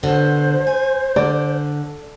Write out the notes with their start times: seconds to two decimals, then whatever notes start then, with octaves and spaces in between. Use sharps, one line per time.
0.03 B2 D3 C5
0.67 G#5
1.16 D3 D5